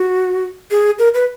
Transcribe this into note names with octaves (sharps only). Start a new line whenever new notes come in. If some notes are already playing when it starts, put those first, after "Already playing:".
Already playing: F#4
G#4
A#4
B4